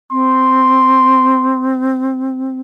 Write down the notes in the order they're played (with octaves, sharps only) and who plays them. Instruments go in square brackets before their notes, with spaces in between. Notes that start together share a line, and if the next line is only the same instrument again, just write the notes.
[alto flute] C4 [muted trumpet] C6